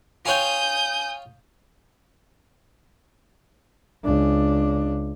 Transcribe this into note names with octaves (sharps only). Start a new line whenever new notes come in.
F4 C#5 G5 G#5 D#6 G6
C#2 D4